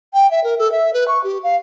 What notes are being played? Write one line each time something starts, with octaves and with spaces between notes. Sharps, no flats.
G5
E5
A#4
A4
E5
B4
C#6
G4
F5